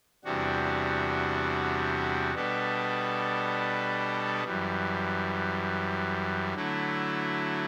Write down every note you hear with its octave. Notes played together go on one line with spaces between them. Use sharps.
E2 C3 G3 D4 F#4
B2 G3 B3 D4 A4
F#2 E3 G3
D3 F#3 A3 E4